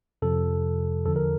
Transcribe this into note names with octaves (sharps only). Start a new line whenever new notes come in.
F2 C3 F3 A4
E2 D3 F3 A4
A#4